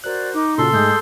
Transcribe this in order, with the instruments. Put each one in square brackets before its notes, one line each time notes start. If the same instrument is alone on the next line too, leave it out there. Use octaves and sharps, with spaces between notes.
[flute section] F#4 C5 D5 [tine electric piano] A#4 F#6
[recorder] D#4 [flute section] D6
[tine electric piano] A#2 C#3 [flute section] C#4 F4 F#4 [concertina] A4 C6
[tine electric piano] G#2 A3 [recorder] G#3 [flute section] G#4 D#6 G6